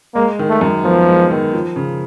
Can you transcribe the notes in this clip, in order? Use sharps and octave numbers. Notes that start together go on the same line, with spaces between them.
G#3 A#3
D#3
A3
F#2
F3 B3
G#3
D#3
F3
C#3